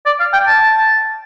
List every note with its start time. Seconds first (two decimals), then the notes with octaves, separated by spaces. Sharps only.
0.06 D5
0.20 F5
0.33 G5
0.47 A5